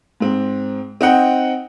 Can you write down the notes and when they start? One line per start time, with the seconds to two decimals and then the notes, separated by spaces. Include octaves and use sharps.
0.20 G#2 C4
1.01 C4 D#4 F#5 G5